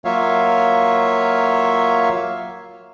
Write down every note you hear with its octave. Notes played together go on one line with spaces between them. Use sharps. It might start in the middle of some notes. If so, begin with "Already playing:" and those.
F#3 A#3 F4 C#5 E5 F5